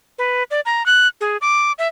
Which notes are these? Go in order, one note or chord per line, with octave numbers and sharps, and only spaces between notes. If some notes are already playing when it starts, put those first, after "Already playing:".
B4
D5
A#5
F#6
G#4
D6
E5